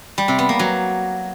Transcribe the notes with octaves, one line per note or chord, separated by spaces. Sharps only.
G3
C3
B3
A#3
F#3